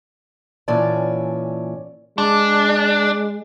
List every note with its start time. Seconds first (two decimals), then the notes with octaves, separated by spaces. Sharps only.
0.68 A#2 E3 C#4 C#5 D5 A5
2.18 G#3 D4